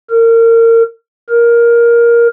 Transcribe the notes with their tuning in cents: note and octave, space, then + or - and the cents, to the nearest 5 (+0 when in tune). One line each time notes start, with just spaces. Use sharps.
A#4 -30
A#4 +10